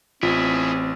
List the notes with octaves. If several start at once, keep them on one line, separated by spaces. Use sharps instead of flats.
A1 C4 E4 F4 G#4